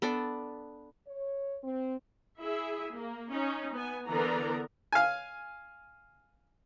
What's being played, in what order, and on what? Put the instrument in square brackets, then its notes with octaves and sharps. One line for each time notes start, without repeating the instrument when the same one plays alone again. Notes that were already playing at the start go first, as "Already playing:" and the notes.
[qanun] B3 D4 A4 D5
[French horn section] C#5
C4
[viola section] E4 G#4 E5
A#3
C#4 D#4
B3 G#5
D3 E3 B3 A#4 D5 A#5
[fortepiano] F5 G#5